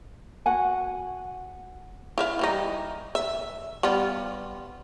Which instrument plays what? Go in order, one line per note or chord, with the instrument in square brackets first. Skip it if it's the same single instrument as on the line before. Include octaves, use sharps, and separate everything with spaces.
[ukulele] F#4 F#5 G#5
[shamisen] E4 E5 F5
E3 G3 D#4
E5
G3 B3 F4